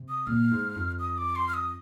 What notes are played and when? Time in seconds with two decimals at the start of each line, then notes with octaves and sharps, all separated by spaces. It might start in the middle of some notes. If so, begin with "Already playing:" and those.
Already playing: C3
0.09 D#6
0.27 A#2 F6
0.51 G#2
0.75 F2
0.99 D#6
1.18 D6
1.36 C6
1.48 F6
1.54 D#6